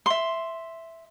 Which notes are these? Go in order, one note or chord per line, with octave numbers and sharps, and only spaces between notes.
E5 C6